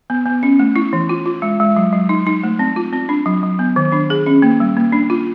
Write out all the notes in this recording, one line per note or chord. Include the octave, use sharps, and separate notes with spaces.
B3
B3
C#4
A3
E4
E3
F4
F4
G#3
G#3
F#3
F#3
D#4
D#4
A3
C4
F4
C4
D4
F#3
F#3
B3
D#3
D4
G#4
C#4
A#3
G3
A#3
D4
F4